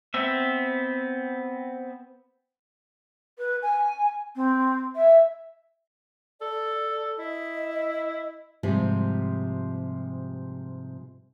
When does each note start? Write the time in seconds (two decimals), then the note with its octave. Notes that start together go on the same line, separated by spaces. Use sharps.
0.14 B3 C4 E5
3.38 B4
3.62 G#5
4.36 C4
4.95 E5
6.41 A4 D5
7.18 E4 D#5
8.63 G#2 C3 F3 G3